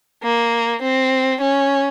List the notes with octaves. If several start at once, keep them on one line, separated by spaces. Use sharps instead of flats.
A#3
C4
C#4